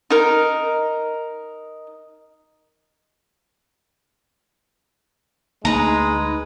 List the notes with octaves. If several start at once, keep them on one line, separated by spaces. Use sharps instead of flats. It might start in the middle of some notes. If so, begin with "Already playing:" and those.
D#4 A#4
D2 G#3 A#3 D#4 B4 A#5